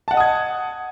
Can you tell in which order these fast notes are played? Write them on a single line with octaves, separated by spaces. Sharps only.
A5 F#5 D#5 D#6 G#6